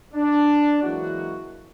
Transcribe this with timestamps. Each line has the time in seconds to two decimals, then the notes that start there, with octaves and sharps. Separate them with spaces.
0.14 D4
0.83 E3 F#3 G#3 A#3 E4 F#4